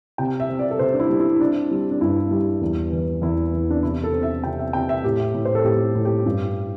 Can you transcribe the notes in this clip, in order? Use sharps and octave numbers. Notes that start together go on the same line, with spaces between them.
C3 G5
E5
C4
D5
A4
C3 C5
D4
E4
G3
E4
C4 D4
G3
D4
G2 E4
G3
E2
E3
E2 E4
E2
D4
C3 E4
A4
C4
E5
C3 G5
E5
C3 G5
E5
A2 G4
A2
C5
A4
A2 G4
A2
G4
G2